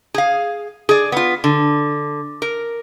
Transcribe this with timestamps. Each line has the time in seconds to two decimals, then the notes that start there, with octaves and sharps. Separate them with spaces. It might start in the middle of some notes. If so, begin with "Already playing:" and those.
0.14 G#4 F5
0.89 G#4 D5
1.12 B3 F4
1.44 D3
2.42 A#4